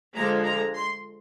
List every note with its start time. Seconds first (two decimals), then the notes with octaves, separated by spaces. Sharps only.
0.14 D3 F3 G#3 A#5
0.45 A#5
0.75 C6